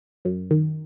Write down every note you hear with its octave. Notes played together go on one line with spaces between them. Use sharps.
F#2
D#3